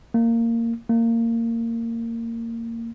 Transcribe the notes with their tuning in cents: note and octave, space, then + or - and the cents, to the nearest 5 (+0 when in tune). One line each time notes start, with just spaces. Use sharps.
A#3 -15
A#3 -20